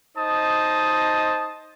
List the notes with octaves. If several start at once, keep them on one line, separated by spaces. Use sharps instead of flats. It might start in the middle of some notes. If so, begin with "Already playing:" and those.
D#4 C5 D#5 A5 D#6